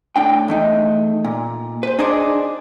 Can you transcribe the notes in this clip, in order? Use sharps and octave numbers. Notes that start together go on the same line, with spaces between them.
A2 D4 G5
E2 A3 D#4
A#2
B4 C5
D4 D#4 G#4 C5 D5